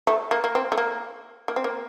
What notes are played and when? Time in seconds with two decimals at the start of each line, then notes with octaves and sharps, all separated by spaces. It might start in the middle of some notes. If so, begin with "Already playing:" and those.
0.07 A3
0.31 A#3
0.44 A#3
0.55 C4
0.72 A3
0.78 A#3
1.48 A#3
1.56 C4
1.64 A#3